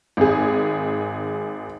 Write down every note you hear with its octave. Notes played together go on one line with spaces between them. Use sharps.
G#1 G#4